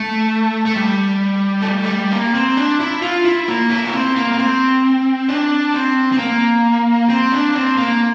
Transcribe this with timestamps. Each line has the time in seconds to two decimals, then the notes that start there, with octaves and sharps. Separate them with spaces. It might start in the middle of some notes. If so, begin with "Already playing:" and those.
Already playing: A3
0.66 A3
0.76 G3
1.61 A3
1.66 G3
1.83 A3
1.90 G3
2.11 A#3
2.35 C4
2.57 D4
2.80 E4
3.02 F4
3.25 E4
3.48 A#3
3.70 E4
3.85 A#3
3.93 C4
4.16 A#3
4.33 A#3
4.38 C4
5.29 D4
5.74 C4
6.12 C4
6.18 A#3
7.10 C4
7.32 D4
7.55 C4
7.77 A#3